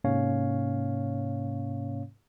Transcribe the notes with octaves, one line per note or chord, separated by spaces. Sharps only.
G#2 C3 A#3 C#4 C#5 F5